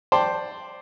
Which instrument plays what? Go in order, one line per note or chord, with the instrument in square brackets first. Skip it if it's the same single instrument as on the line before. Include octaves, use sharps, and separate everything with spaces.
[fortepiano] C5 D5 G5 A5